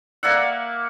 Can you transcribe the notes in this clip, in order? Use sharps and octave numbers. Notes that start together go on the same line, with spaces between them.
A#3 D5 E5 F#5